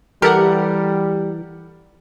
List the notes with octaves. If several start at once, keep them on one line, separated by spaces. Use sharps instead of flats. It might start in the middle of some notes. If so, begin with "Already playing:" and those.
E3 G3 G4 A4 A#4 F#5